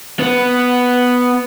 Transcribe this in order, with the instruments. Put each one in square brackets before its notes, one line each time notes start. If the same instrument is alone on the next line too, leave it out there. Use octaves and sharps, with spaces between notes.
[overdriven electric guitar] B3